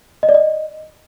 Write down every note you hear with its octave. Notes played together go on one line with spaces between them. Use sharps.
D#5
D5
D#5